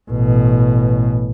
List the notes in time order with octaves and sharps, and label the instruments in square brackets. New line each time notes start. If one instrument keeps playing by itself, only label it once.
[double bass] A1 B2